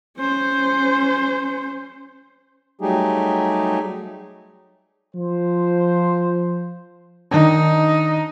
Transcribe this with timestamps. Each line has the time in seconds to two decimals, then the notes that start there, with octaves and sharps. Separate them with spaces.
0.17 C#4 C5
2.81 F#3 G3 A3 D#4 G4 G#4
5.14 F3 C5
7.31 D#3 D4 D#4